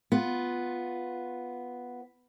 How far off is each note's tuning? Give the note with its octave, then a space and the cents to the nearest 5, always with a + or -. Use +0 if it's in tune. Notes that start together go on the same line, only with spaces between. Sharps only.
B3 +0 F4 +0